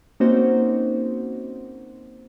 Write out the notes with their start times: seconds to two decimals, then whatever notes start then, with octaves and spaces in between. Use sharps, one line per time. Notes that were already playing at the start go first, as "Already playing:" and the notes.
0.20 A#3 C4 C#4 D#4 F#4 C5